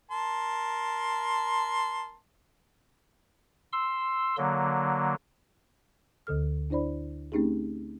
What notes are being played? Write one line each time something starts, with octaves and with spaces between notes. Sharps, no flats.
A#4 A5 C6
C6 E6
D3 F#3 A#3
D2 D3 A4 F6
D4 E4 C5 D5 B5
A3 C4 C#4 D#4 G4 G#4